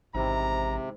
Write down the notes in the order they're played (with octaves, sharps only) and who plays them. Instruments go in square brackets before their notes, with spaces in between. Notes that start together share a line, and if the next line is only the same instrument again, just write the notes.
[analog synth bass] A1 [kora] G#2 D#3 E4 [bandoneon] C3 [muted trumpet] A#5